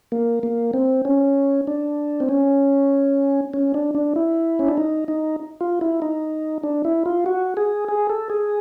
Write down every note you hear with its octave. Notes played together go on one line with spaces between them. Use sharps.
A#3
A#3
C4
C#4
D4
C4
C#4
C#4
D4
D4
E4
C#4
D4
D#4
D#4
F4
E4
D#4
D4
E4
F4
F#4
G#4
G#4
A4
G#4